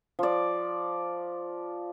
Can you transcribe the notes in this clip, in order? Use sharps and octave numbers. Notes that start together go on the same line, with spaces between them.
F3 D5